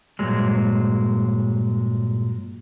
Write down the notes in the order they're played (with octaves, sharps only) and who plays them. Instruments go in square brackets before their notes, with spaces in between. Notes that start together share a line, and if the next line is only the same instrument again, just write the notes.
[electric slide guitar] G2 A#2 F#3 G#3